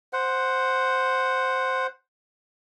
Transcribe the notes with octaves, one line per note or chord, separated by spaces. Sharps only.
C5 F#5